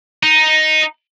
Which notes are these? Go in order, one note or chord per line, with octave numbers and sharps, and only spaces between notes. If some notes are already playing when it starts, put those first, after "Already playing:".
D#4